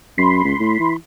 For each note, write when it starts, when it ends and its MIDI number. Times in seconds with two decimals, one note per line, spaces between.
0.18 0.43 42
0.18 0.96 83
0.18 0.96 84
0.45 0.54 37
0.60 0.77 45
0.80 0.95 52